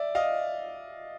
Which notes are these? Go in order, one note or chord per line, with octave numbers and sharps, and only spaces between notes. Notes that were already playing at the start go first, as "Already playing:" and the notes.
Already playing: D5 E5
D#5 F5